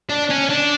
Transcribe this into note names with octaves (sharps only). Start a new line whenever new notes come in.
D4
C#4
D4